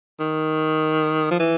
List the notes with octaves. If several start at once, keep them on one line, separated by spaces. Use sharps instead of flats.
D#3
F3
E3